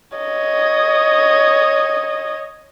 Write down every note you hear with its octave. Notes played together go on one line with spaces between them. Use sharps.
C#5 D#5